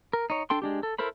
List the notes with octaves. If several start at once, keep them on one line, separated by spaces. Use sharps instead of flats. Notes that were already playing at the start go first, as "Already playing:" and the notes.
A#4
D#4 C#5
D4 A4 G5 C6
G#3 D4 G4
A4
E4 A4 A#4 C5 B5